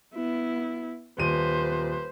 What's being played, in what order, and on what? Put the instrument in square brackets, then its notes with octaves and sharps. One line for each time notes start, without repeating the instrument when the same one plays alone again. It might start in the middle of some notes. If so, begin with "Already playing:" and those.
[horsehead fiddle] B3 E4
[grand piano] D#1 D#7 [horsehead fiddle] B4 C5